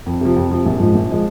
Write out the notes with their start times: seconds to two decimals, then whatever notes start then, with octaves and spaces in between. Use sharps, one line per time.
0.06 F2
0.21 C3 F3
0.36 F2
0.51 C3 F3
0.66 A#1
0.79 G#2 F3 G#3
0.95 A#1
1.11 F3 G#3